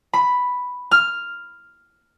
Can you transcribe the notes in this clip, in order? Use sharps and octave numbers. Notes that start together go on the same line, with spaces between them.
B5
F6